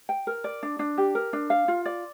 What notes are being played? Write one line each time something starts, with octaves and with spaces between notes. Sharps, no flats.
G5
A#4
D5
D4
D4
G4
A#4
D4
F5
F4
D5